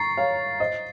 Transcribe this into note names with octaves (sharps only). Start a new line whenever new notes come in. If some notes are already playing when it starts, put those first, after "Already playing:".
Already playing: A#5 C#6 A6 C7
C#5 F5
C5 D#5